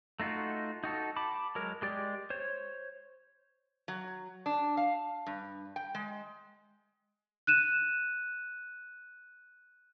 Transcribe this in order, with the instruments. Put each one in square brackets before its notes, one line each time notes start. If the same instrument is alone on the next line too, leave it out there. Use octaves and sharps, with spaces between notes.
[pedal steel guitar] A3 D#4 F4 F#4
D#4 F#4 A4
A5 B5 D6
F#3 G#3 A#4
G#3 G4 D5
C5 C#5
[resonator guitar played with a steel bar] F#3
D4
F5
G2
G5
G#3
[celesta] F#6 D#7 E7